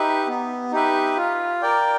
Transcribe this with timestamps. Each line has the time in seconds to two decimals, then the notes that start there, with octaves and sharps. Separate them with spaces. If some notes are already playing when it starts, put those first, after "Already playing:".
Already playing: D#4 G4 B4 E5
0.27 B3
0.72 D#4 G4 B4 E5
1.17 F4
1.62 A#4 D5 G5